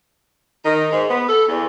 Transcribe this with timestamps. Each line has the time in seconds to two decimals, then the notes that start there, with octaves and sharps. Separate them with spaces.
0.65 D#3
0.92 G#2
1.09 B3
1.29 A4
1.48 E2